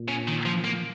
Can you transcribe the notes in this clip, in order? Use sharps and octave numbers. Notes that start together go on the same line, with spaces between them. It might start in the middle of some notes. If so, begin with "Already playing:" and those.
Already playing: A#2
C#3
D#3
F3
A#3